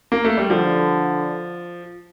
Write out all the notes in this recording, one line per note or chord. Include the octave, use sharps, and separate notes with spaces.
A#3
A3
G3
D3 F3